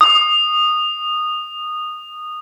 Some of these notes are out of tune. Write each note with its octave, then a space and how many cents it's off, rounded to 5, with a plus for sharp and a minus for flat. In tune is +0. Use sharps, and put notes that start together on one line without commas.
D#6 -15